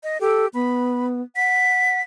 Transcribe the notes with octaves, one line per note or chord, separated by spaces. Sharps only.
D#5
G4 A4
B3 B5
F#5 B6